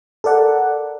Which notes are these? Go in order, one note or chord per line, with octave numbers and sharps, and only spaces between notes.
A4 A#4 D5 F#5